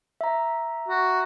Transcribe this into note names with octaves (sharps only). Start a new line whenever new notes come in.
E5 A#5
F#4